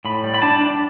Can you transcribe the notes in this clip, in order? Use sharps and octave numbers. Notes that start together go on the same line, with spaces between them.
A2 B5
G3
B5
D4 A5
D4